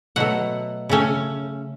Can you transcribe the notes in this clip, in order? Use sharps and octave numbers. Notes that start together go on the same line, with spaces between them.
B2 F#3 A3 F#5
C#3 A3 C#4